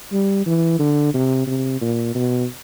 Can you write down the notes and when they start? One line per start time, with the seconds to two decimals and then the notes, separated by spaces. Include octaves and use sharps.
0.12 G3
0.46 E3
0.79 D3
1.14 C3
1.47 C3
1.81 A#2
2.15 B2